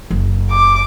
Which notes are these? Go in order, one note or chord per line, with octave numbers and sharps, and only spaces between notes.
F#1
D6